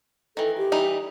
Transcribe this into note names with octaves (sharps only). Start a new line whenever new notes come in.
D#3 E3 A4
G4
E3 G3 D#4